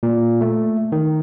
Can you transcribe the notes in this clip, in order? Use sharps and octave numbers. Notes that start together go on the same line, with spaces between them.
A#2
A3
D#3